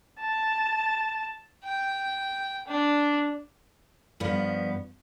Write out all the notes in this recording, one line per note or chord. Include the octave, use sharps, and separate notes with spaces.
A5
G5
D4
G2 F3 B3